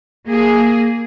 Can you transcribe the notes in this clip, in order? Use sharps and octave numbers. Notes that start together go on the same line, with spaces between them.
A#3 G#4